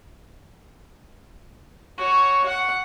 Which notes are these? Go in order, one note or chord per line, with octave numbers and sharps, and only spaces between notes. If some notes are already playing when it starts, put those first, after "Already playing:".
F#4 C#5
F#5